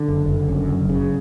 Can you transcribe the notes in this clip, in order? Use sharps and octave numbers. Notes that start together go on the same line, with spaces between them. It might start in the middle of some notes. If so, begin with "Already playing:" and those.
Already playing: D3
F#1
F#1
F#2
F#1
C#3